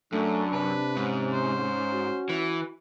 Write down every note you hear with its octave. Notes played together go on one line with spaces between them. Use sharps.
F#2 A3 D4
C3 B4
G#2 C#4
C5
F#4
E3